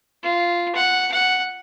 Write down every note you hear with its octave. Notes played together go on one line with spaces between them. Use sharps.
F4
F#5
F#5